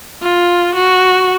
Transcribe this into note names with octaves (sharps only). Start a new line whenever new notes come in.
F4
F#4